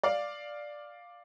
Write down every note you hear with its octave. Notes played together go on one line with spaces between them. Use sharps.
D5 F5